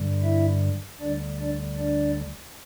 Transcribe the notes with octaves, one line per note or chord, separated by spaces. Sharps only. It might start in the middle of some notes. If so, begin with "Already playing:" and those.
Already playing: G2 D3 G3
E4 E5
D2 D3 G3 D4 D5
D4 D5
D4 D5